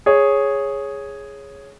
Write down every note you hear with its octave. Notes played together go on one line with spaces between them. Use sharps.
G#4 C#5